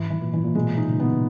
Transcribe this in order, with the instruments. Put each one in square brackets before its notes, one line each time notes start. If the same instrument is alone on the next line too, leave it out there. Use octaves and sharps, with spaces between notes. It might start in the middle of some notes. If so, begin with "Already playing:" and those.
Already playing: [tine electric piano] G#2 [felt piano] E3
[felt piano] E3
[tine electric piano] A#2
[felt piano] E3
[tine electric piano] A#2
[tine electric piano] B2 [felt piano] G#3
[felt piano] D#4
[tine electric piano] C#3
[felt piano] B3